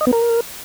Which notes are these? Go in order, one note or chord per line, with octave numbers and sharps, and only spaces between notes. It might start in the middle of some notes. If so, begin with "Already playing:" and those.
D#5
B3
A#4